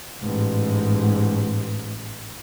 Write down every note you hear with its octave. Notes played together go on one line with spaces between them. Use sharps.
A1 G#2